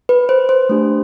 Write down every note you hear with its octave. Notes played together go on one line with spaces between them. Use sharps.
B4
C5
C5
A3 D4 G4